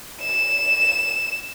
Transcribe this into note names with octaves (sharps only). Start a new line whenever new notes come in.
E7